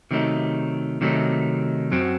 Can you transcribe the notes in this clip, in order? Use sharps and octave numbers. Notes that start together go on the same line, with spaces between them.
C3 D#3 F#3 A3 D#4
C3 D#3 F#3 A3 D#4
F#2 F#3 C4